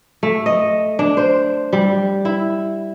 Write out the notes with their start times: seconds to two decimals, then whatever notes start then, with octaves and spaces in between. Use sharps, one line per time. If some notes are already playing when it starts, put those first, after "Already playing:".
0.23 A3
0.46 D#5
0.99 D4
1.17 C5
1.73 G3
2.25 E4